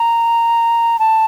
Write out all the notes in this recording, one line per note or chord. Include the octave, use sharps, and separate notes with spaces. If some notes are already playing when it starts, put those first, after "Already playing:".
Already playing: A#5
A5